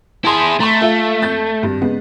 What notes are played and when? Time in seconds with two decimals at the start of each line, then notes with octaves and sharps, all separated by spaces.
0.25 E4 G#4 A5 C6
0.60 A3 A#5 C6 C#6
0.81 F4 A4 E5
1.22 F2 G6 A6
1.63 G#1 G2
1.81 C#3 G#3 B3